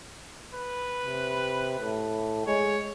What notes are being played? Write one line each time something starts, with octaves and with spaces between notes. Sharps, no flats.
B4
C3
A2
G#3 C#5